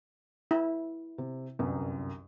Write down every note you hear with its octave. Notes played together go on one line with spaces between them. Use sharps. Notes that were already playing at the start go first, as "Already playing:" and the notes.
E4
C3
G1 C2 F#2